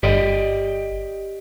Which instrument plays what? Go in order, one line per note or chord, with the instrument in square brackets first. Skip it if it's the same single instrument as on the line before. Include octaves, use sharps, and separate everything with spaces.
[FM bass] G1 [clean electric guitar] G4 D5 D#5